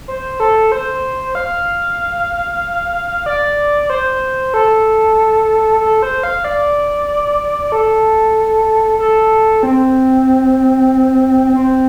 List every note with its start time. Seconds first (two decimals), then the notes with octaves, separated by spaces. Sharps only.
0.08 C5
0.40 A4
0.72 C5
1.35 F5
3.26 D5
3.90 C5
4.54 A4
5.81 A4
6.03 C5
6.23 F5
6.44 D5
7.72 A4
8.99 A4
9.63 C4
11.53 C4